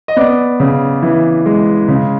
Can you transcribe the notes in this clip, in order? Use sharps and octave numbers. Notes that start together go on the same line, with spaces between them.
D#5
B3 D5
C#3
E3
G#3
C#3